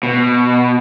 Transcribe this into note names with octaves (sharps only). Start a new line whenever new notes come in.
B2